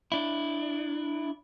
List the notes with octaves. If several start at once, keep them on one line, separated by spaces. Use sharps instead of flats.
D4 E4